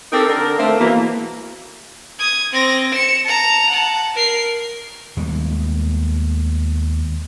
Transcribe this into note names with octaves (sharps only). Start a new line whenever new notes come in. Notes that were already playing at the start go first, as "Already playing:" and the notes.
C4 D#4 G4 A4 A#4
D3 A#4
A3 A#3 C4
B2 E3 G#3 A#3
D#6 G#6
C4 A#6
C#7 E7
A5 A#5
F#5 A5
A#4 C7
D#2 B2 G3 G#3